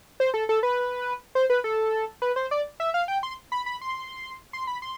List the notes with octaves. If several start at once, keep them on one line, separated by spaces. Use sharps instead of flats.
C5
A4
A4
B4
C5
B4
A4
B4
C5
D5
E5
F5
G5
C6
B5
B5
C6
C6
B5
C6